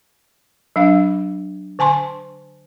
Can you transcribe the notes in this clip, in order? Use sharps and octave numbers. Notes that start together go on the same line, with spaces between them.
F#3 D4 F5
D3 G#5 A5 C6 C#6